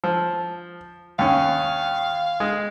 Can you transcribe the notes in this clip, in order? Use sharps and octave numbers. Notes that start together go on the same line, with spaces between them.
F3
D#2 C#4 F5
G#3